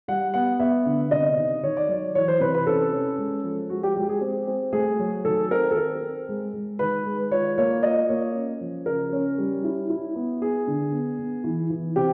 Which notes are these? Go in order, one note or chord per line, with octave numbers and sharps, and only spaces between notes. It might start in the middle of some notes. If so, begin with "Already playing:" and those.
G3 F#5
B3 F#5
B3 E5
D3
C3 D#5
D#3
D#3 C#5
D5
F#3 C#5
E3 C#5
C5
C3 B4
B4
C#4 A4
C#4
G#3
F3
G#3 F#4
G4
G#3 G4
G#4
C4
C4
A3 G#4
F#3
D#3 A4
C4 A#4
A4
C4 A#4
C4
G#3
G#3
D#3 B4
G#3
F4 C#5
A#3 C#5
F4 D#5
A#3 C#5
C#4
F3
C#3 A#4
C#4
G3
E4
E4
B3
B3 G#4
D3
B3
B3
E3
E3
C3 G4